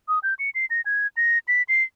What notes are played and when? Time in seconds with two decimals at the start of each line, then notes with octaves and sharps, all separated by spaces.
0.08 D#6
0.23 G6
0.39 C#7
0.55 C7
0.70 A#6
0.86 G#6
1.17 A#6
1.48 B6
1.69 C7